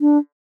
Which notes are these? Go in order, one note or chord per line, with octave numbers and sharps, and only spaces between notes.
D4